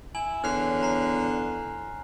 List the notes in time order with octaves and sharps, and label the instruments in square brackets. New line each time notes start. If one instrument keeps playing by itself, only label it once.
[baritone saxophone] E4 [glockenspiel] G#5 F#7
[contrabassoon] E2 [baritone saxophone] D3 [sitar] C#5 [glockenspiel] F6 F#6 C7
[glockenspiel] A#5 C7